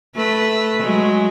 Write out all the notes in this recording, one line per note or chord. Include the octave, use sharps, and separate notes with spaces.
A3 B4
F#3 G#3